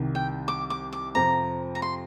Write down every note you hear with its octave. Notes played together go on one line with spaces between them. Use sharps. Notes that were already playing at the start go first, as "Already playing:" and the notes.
Already playing: C2 C3 D#3
G5
D6
D6
D6
F2 C3 F3 C4 A#5
A#5
C6